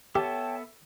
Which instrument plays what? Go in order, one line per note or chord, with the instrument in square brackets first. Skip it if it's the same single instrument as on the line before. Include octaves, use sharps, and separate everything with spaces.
[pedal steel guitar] B3 A4 E5 [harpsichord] G4 [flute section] C#5 G5 A5